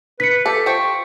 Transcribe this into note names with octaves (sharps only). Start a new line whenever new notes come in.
B4 B6 C#7
G4 A4
F3 G5 C#6